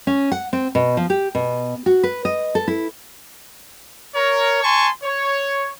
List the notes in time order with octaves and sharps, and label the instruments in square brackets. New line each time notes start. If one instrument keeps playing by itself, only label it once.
[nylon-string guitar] C#4
F#5
C4
B2
F3
G4
B2
F#4
B4
D#5
A4
E4
[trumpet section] A#4 C#5
G#5 A5 C6 C#6
C#5